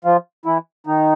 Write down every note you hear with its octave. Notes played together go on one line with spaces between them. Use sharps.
F3 F4
E3 E4
D#3 D#4